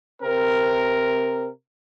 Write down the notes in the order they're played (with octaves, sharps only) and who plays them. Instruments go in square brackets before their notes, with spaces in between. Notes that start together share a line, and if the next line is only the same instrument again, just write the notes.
[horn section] C3 C4 A#4